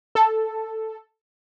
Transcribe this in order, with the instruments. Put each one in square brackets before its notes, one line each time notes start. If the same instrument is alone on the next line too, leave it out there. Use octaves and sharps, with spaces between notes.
[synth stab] A4